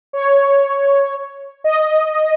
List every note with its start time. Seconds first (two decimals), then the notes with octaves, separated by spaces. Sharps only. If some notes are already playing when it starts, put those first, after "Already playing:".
0.13 C#5
1.64 D#5